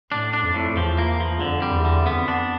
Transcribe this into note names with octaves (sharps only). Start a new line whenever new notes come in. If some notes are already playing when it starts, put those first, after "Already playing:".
A2 D4
D4
F2
A2
E2 F3
A#3
F3
F2 D3
G3
E2
D3
F2 B3
D4